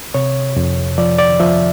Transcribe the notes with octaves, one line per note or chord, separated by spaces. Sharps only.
C3 C#5
F2
F3 D5
D5
F3 E5